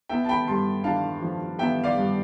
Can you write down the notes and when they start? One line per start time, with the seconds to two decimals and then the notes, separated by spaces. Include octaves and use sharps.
0.09 B3 E5 G5
0.24 A5
0.29 G5 B5
0.47 G2 A5 C6
0.84 D4 F5 A5
1.22 F3
1.59 B3 E5 G5
1.84 D5 F5
1.96 G2